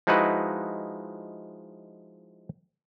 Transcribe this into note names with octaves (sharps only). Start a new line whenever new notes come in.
F3 G#3 D#4 E4 F#4 B4